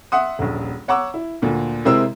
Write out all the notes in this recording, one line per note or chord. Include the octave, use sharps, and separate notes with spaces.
E5 F#5 C6 D#6
D#1 A#1
C#5 F#5 A#5 C#6 D6 E6
E4
D2 A#2 D3
C3 G#3 C4 E4 A#4 E6